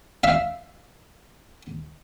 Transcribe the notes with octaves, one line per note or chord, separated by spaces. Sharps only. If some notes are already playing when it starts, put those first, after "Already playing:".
E5 F5